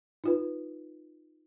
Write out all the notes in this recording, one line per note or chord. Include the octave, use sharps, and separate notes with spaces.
D#4 F4 B4